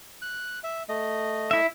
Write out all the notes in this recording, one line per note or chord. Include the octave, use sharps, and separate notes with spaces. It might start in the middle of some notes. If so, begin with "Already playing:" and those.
F#6
E5
A3 D#5
E4 E5